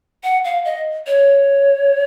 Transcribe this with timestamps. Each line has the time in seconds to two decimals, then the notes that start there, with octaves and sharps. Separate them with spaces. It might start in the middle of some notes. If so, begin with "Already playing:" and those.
0.24 F#5
0.45 F5
0.65 D#5
1.07 C#5